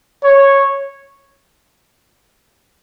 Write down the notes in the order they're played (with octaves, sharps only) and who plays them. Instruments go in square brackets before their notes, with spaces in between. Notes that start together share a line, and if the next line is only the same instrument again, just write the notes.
[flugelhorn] C#5